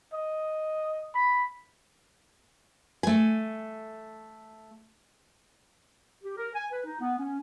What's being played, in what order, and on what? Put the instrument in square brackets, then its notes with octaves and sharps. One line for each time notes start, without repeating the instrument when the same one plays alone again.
[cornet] D#5
B5
[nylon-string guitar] A3 G#5
[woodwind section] G4
A#4
G#5
B4
D#4
B3
C#4